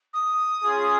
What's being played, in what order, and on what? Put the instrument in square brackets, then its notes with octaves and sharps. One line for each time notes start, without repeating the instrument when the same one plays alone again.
[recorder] D#6
[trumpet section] C#4 F4 G#4